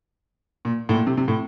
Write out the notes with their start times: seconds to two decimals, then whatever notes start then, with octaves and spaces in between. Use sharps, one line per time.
0.65 A#2
0.89 A2
0.93 A#2
1.07 C3
1.17 C3
1.28 A2